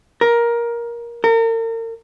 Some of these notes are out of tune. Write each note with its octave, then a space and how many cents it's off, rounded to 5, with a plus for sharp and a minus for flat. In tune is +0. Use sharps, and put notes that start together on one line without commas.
A#4 +15
A#4 -40